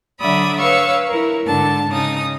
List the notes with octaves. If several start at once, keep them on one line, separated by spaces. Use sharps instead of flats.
D3 F#3 D5 E5 B5 D#6
B4 C#5 F5 C#6 E6
E4 A#4
G#2 D3 A5
C#3 D#4 D#6